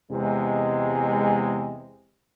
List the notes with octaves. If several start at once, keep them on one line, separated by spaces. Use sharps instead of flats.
E2 C3 G#3